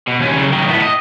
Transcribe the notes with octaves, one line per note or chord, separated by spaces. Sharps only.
B2
D#2 C#4
C#3 F#3
D#3 F#3
A2 B3
D#5